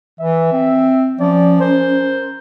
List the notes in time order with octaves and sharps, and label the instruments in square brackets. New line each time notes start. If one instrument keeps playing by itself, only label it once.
[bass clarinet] E3 [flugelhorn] E5
[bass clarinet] C4
[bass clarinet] F3 [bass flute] C#4 [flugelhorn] D5
[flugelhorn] A#4 [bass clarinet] C5